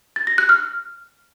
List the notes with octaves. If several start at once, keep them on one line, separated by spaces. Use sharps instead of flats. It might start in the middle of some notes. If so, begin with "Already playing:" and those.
A6
A#6
F#6
F6